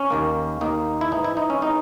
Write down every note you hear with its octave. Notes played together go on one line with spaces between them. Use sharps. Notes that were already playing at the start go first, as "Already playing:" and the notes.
Already playing: C#4
D#2 D#3 A#3
D#2 D#3 A#3 D#4
E4
G#2 E3 G#3 B3 D#4
E4
D#4
C#4
E3 G#3 B3 D#4